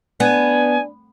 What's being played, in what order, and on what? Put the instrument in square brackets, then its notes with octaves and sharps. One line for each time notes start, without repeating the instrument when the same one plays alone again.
[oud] B3 [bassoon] D4 [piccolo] G#5